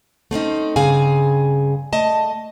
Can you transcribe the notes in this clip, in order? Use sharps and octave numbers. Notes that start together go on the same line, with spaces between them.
A3 C4 C#4 D#4
G2 C#3 C4 G#4 F5 G#5
A3 D#5 A5